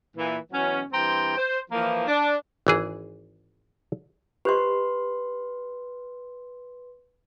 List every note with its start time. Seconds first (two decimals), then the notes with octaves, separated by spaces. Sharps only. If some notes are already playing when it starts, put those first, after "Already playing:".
0.17 A#2 E3
0.53 B2 E3 F#3 C#4
0.92 G2 E3 C4 G5 A#5 C6
1.37 C5
1.71 E3 F3 A#3
2.07 D4
2.67 G#1 E3 G#4
4.45 G4 B4 C5 D#5 C6